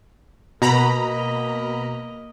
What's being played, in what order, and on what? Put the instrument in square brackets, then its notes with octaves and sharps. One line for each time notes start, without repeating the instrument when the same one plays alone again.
[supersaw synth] B2 A#5 B5 [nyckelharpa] A#3 D#5